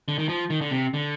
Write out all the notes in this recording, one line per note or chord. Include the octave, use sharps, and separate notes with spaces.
D3
D#3
F3
D#3
D3
C3
D3